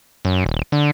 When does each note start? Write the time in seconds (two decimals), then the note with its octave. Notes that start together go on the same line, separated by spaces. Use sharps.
0.25 F#2
0.46 D#1
0.72 D3